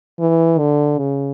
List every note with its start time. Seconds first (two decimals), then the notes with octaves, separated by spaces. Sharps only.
0.20 E3
0.59 D3
0.98 C#3